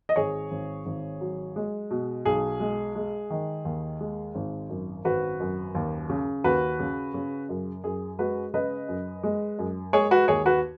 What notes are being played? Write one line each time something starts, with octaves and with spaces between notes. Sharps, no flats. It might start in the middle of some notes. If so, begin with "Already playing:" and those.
D#5
G#1 G#4 C#5
G#1
G#1
F#3
G#3
B2
B1 G#4
G#3
G#3
D#3
D#2
G#3
G#1
F#2
G#1 F#4 B4
F#2
D#2
C#3
D#2 F#4 B4
C#3
C#3
F#2
F#2 G#4
G#3 F#4 B4
C#3 B4 D#5
F#2
G#3
F#2
G#3 G#4 C#5
F#4 B4
D#2 G#4 C#5
F#4 B4